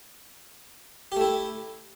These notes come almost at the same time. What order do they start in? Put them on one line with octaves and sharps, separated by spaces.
G4 A3 E4